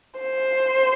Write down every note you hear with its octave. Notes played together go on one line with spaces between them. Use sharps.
C5